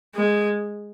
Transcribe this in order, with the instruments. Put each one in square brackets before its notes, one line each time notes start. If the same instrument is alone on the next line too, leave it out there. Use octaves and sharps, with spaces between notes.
[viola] G#3